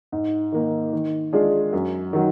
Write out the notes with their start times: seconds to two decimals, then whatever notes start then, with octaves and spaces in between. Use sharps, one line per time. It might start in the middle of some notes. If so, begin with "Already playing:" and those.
0.12 G#2
0.52 D#3 A#3
0.93 D#3
1.33 G#3 D4 F4 G#4
1.73 F#2
2.13 D#3 F#3